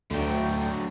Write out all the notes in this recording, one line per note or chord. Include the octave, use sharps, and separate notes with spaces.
D2 D3 F#3 A3 G5